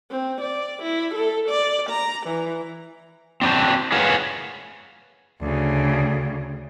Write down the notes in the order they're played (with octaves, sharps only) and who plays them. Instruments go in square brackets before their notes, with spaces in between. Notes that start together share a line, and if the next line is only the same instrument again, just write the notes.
[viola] C4
D5
E4
A4
D5
A#5
E3
[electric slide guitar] C4 D4 F#4 C5
G#4 A#4 B4 C#5 F5 F#5
[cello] D2 C#3